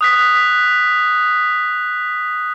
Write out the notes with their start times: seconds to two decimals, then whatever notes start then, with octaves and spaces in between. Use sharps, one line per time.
0.01 D#6 F#6 B6